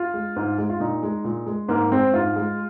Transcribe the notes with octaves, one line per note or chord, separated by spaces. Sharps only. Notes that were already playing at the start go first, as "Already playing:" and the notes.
Already playing: F4
G#3
G#2
G#3
F4
A#2 D#4
G#3
A#2
G#3
G#2 A#3
G#3 C4
G#2 F4
G#3